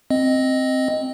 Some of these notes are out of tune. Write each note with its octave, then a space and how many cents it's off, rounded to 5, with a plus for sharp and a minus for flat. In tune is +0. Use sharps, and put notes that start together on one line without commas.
C4 +0 D#5 +0